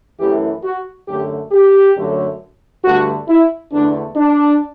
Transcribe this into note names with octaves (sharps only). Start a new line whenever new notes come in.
F#2 E3 A3 G4
F#4
F#2 D3 A3 G4
G4
F#2 D3 F#3 A3
G2 D3 A3 F#4
E4
E2 D3 A3 D4
D4